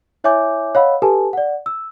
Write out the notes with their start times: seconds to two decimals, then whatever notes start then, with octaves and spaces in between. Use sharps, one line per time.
0.24 E4 C#5 E5 G#5 D6 G6
0.75 C#5 D#5 F5 F#5 B5 E6
1.02 G4 A4 B4 G#5 A5
1.33 D5 F#5
1.66 E6